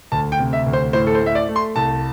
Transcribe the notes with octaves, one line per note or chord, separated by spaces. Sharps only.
D2 A5
G5
C3
E5
D2
C5
A2 C5
A4
C5
A3 E5
D5
A3
C6
C2 A5